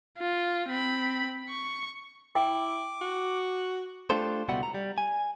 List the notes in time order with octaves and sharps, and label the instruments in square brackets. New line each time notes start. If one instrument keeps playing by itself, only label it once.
[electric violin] F4
C4 B5
C#6
[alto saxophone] E4 [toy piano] G5 [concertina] D6
[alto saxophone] F#4
[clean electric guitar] A3 D4 F4 G4 A4 C5
C#2 B2 G3 E4 F#5
A#5
G3
G#5